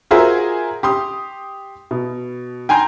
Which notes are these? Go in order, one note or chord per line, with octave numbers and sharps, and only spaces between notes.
F4 F#4 G#4 A#4 C5 E5
G4 C6 D#6
B2
G5 G#5 A#5 C6 G6